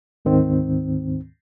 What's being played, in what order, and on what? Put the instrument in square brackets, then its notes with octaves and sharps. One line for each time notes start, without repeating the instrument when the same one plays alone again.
[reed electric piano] D2 G#2 D#3 C4